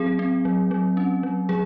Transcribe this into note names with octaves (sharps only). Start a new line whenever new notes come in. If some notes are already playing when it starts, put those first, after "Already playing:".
Already playing: F#3 C4 G#4
C4
F#3
F#3
C#4
F#3
F#3 G#4